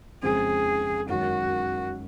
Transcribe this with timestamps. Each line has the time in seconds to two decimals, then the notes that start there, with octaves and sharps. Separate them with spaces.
0.23 F2 C#3 G#3 C4 G#4
1.09 F#2 D#3 G#3 C#4 F#4